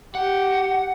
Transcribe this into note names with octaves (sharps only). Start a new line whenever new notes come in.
G4 F#5